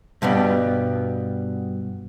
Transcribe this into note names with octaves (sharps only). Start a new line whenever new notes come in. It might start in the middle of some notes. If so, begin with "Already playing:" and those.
G2 B2 G3 B3